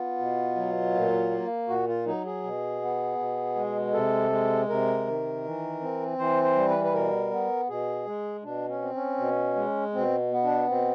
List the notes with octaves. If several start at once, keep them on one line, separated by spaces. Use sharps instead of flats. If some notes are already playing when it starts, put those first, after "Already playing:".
Already playing: B3 F4
B2
F#3
A#2
A#3
A#2 F#4
F4
F#3 D#4
G#4
B2
B3
B2
G#3
C3 A4
G#3
C3 A#4
D#3
E3
C4
E3 C5
C5
G3
B4
B4
B2 A#4
B3
B2 G#4
G#3
B2 D4
C#4
C4
C#4
B2
G#3
B2 C4
B3
D4
B2 C4